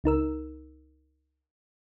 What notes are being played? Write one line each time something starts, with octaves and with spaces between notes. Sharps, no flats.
C#2 D#4 A#4 E6